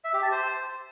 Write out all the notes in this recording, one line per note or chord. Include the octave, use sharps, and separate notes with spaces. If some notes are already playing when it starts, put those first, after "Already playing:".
E5
G4
A5
C5